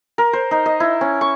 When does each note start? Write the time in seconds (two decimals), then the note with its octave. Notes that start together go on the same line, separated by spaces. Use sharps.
0.18 A#4
0.33 C5
0.51 D#4
0.66 D#5
0.80 E4
1.01 C#4
1.21 C#6